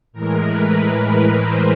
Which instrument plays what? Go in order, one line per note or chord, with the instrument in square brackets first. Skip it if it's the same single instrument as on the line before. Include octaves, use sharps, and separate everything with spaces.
[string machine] A2 E3 G#3 A#4
B4
A#4
C5